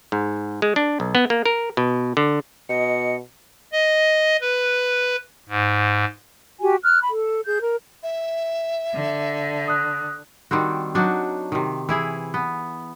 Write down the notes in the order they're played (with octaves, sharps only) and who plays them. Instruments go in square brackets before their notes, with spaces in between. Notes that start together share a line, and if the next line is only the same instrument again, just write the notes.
[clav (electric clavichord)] G#2
G#3
D4
B1
B3
A#3
A#4
B2
D3
[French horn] B2 [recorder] D#5 [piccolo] C#7
[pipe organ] D#5
B4
G#2
[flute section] F#4 G4 G#5
F6 F#6
B5
A4
G#4 G6
A#4
[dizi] E5
[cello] D3
[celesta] D#6 F#6
[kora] D#3 G3 C4 F#4
F#3 D4 D#4 F#4
C3 D#3
E3 E4 G#4
B3